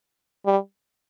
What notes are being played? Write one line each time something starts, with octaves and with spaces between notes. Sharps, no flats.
G3